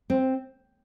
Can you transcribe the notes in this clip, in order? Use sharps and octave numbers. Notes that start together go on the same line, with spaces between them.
C4